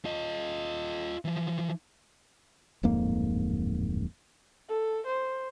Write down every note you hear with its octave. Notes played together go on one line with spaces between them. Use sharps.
F4 D#5
E3 F3
D1 F2 G#2 A#3
A4
C5